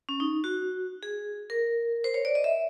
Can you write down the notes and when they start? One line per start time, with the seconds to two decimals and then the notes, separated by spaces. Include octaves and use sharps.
0.09 C#4
0.20 D#4
0.44 F#4
1.03 G#4
1.50 A#4
2.04 C5
2.14 C#5
2.25 D5
2.35 D#5
2.44 E5